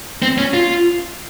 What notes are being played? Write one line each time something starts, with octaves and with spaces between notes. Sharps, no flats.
C4
C#4
F4